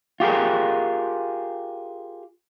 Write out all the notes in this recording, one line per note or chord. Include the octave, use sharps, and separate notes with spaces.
F4 G4 G#4 A#4